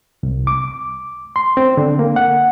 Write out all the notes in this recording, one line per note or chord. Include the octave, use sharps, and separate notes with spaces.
C2
D6
C6
C4
D3
A#3
F#5